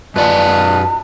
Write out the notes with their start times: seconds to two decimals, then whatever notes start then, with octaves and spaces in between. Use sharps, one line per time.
0.16 F#2 F4 B4 D5 D#5 G#5 A5